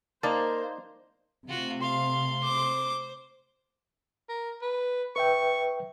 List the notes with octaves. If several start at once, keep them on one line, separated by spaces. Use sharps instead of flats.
A#3 D#4 C5 D5 A5
C3 A3 F4 F#4
F5 C6
C5 D6
A#4
B4
B4 E5 G5 C#6